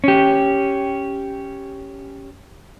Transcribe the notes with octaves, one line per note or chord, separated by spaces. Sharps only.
C#4 G4